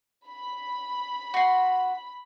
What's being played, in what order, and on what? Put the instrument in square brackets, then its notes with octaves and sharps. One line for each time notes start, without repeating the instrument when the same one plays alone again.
[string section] B5
[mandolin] F#4 C6